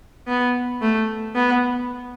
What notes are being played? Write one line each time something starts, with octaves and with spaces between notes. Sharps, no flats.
B3
A3
B3